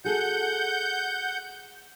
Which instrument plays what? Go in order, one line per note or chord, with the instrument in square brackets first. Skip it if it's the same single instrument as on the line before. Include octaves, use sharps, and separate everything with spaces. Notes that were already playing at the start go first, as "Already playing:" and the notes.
[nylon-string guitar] F#4 G#4 A4 [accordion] F#5 G6